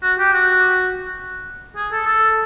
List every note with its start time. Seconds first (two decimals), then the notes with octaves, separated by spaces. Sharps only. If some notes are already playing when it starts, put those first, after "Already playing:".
0.02 F#4
0.19 G4
0.34 F#4
1.76 G#4
1.92 A4
2.07 A4